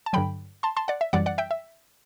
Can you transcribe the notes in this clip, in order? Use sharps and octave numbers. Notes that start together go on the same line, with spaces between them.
A5
G2 D3 F#3 G5 B5
A5 C6
A5 C6
D5 F#5
E5
F#2 E3 G3 D5 F#5
D5 F#5
E5 G5
E5